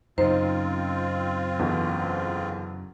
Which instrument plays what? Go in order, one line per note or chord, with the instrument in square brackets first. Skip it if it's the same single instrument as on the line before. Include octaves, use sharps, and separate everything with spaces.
[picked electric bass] F#2 C#3 [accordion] C4 F4 [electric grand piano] D#4 [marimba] C5
[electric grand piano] E2 B2 D3